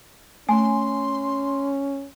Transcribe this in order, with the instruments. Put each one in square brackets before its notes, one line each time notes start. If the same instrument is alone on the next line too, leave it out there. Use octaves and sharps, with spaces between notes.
[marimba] A3 [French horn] C#4 [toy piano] G#5 [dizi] C6